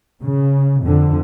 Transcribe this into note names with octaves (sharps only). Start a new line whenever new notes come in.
C#3
F2 D3